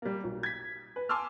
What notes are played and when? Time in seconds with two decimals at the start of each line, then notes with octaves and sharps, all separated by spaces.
0.02 G3 A#3
0.24 B1
0.43 G#6 B6
0.96 B4
1.09 G#5 A5 C6 D6 E6 F6